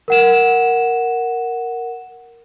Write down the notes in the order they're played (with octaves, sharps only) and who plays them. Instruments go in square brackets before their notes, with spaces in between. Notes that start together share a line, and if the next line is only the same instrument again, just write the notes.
[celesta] A#4 F#5 E7